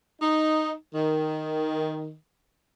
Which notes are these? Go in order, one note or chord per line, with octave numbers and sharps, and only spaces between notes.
D#4
D#3